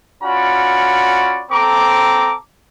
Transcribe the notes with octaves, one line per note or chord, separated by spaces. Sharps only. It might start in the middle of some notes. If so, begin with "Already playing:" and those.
C#4 F4 F#4 D5 B5
C4 A4 A#5 D6